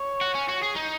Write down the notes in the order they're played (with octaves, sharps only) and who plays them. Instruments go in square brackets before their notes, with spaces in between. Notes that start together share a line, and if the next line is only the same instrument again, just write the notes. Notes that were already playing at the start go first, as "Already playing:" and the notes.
Already playing: [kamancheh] C#5
[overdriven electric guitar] F#4
C#4
F#4
G#4
D#4